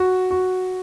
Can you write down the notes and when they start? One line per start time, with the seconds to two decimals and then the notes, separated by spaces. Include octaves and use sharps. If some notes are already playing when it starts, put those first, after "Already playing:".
Already playing: F#4
0.30 F#4